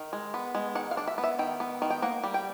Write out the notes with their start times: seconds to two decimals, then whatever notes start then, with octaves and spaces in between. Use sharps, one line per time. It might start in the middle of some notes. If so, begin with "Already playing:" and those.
Already playing: D#3
0.13 G#3
0.34 B3
0.55 G#3
0.75 D#3 F#5
0.91 F5
0.97 D4
1.08 E5
1.18 B3
1.24 E5
1.39 D#3 G5
1.60 B3
1.82 D#3
1.90 G5
2.02 A#3 F#5
2.24 G3
2.34 G5